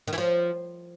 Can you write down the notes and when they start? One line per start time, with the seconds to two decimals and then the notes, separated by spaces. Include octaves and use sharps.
0.08 D#3
0.13 E3
0.18 F3